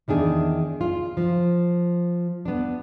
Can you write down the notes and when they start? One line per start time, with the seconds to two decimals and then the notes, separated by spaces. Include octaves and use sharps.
0.08 E2 D#3 D4 G#4
0.81 F4
1.17 F3
2.45 B3 D4